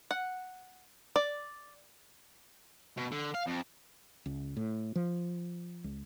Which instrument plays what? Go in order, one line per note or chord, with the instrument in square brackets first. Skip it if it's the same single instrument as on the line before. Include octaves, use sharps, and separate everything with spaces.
[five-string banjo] F#5
D5
[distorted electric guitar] B2
D3
F5
F2
[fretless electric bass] C#2
A2
F3
C#2